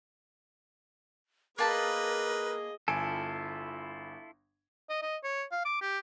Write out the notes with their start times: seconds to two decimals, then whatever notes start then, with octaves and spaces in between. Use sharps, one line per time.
1.58 A#3 G#4 A#4 B4 D#5 A5 B5
2.88 G1 E4 F4 A4 G#5 D7
4.89 D#5
5.02 D#5
5.24 C#5
5.52 F5
5.65 D6
5.81 G4